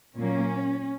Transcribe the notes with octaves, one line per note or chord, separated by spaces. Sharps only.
A#2 F#3 A#3 C#4